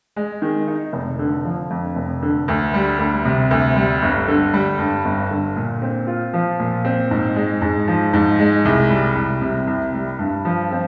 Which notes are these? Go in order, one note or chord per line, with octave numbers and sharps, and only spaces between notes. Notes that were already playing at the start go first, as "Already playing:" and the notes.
G#3
D#3
D#4
F1
D3
F3
F2
F1
D3
D2
G3
D2
C3
D2
G3
G1
D3
G3
G2
G1
D3
A#2
C4
F4
F3
A#2
C4
G#2
G#3
G#2
F3
G#2
G#3
C2
G3
C2
C3
C2
G3
G2
F3
C4